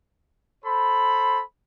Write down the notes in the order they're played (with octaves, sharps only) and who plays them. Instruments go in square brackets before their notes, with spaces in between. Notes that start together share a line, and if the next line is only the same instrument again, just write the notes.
[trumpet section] A4 C5 B5